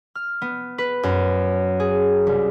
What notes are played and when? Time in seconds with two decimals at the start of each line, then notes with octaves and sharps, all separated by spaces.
0.15 F6
0.42 B3
0.78 B4
1.03 F#2
1.80 G#4
2.27 C2